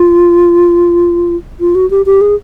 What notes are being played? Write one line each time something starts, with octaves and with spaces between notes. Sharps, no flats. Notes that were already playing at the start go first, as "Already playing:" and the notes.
Already playing: F4
F4
F#4
G4
G4
G#4